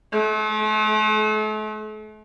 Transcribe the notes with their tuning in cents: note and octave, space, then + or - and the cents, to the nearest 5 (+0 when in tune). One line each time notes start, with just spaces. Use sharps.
A3 -40